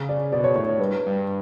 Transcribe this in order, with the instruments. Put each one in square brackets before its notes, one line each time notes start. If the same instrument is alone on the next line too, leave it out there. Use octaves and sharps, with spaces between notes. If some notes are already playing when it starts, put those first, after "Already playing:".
Already playing: [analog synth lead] C#3
[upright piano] D5
[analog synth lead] B2 [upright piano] D5
[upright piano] C#5
[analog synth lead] A2 [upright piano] C#5
[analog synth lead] G2 [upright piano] B4
[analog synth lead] G2